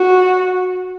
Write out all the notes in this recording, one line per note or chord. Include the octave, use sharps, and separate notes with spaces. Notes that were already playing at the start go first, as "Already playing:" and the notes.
Already playing: F#4